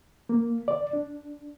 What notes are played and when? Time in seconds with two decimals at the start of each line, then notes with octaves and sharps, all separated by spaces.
0.29 A#3
0.68 D5
0.93 D4